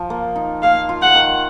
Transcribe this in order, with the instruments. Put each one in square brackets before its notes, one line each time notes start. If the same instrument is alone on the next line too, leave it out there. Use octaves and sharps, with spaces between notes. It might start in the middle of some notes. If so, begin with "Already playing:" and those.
Already playing: [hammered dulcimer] F3
A#3
D#4
[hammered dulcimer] A#3 [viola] F5
[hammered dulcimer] F4
[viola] F#5
[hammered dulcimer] D#3